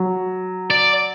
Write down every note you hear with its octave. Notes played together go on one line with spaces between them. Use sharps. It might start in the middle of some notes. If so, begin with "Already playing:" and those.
Already playing: F#3
D5